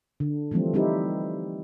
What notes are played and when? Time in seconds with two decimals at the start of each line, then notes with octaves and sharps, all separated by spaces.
0.20 D3
0.51 E3 F3 G3 A3 C4
0.74 G3 C4 D#4 E4 G4